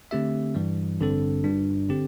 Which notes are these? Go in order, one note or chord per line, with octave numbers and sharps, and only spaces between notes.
D3 A3 C4 G4 E5
G2 E3 G3
A1 G2 D3 C4 A4
G1 G2 G3 D4
D3 C4 G4